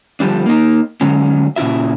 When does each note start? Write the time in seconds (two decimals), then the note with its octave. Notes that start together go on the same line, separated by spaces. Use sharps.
0.20 D3 F3 G3 D4
0.46 A#3 D#4
1.01 D3 F#3 G#3 C#4
1.56 A#2 C#3 E4 F#4 E5